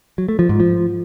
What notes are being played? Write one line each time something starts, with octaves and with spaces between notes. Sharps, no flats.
F#3
A3
F3
G#2
F3